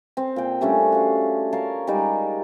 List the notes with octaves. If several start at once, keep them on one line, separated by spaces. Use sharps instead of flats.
C4
A#2 G5
G3 A3 C#4 D4
F#4 F5
A#4 C#5 F5 A5
G3 G#3 D#4 D5